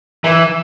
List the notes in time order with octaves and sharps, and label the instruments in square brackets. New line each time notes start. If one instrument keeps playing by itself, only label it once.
[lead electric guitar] E3